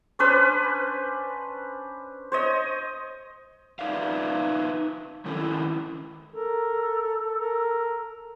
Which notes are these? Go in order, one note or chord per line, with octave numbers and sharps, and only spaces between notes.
C#4 D4 B4 C5
C5 C#5 D#5
D#4 B4 D5 E5 F5
D#3 C#4 E4 A4
A4 A#4
A#4